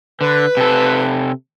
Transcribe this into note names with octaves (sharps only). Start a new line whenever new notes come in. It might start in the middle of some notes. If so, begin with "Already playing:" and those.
D3 B4
C3 A4